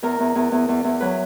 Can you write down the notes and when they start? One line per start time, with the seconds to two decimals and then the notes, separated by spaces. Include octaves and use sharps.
0.03 E2 A#4
0.20 E2
0.35 E2
0.52 E2
0.69 E2
0.84 E2
1.00 F#3 B4